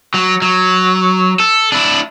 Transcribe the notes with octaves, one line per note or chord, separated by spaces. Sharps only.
F#3
F#3
A4
D4 E4